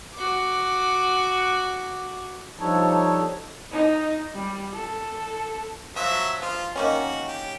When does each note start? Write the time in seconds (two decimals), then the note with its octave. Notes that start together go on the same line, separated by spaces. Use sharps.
0.15 F#4 D6
2.59 F3 G3 D4 D#4 A4 C#5
3.71 D#4
4.34 G3
4.74 A4
5.96 F3 F#3 E5
6.42 F3 F4
6.76 D#3 A#3 C#4 F#4
7.28 G4